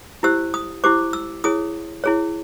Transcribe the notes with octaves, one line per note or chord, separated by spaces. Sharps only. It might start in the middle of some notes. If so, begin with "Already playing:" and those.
E4 G4 C5 E6
D#6
E4 G4 C5 D6
E6
E4 G#4 C#5 D#6
E4 G#4 C#5